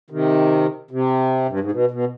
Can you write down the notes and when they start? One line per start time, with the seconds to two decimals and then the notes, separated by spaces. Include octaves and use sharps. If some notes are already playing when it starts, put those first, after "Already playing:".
0.10 C3 D#3
0.91 C3
1.48 G2
1.60 G#2
1.71 B2
1.91 B2